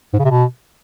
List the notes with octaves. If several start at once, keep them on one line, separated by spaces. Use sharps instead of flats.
G#2
C#3
C3
B2